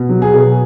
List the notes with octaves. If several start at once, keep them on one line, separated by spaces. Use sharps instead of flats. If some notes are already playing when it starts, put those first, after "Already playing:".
Already playing: B2
F#3
G#4
B2